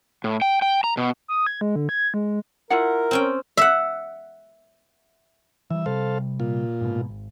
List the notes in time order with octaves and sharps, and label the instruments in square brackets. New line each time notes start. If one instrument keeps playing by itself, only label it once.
[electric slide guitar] A2
G5
G5
A#5
B2
[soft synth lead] D#6
G#6
G#3
D3
G#6
G#3
[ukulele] E4 F4 F#5 [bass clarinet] A#4
[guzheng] C4 C#4 G5
E5 F#5
[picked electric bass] E3 G3 [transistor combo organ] E5
[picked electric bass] C3 G3 [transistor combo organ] A4 C5 F5
[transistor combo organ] A#2 F4
[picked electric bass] G#2 B2
G#1